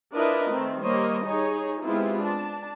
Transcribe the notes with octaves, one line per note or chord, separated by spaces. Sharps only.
D4 E4 F4 A#4 B4 D#5
D#3 A3 C4
G3 A#3 C5 C#5 D#5
D#4 G#4 C#5
G#3 B3 C4 E4 F4 G4
D4 A5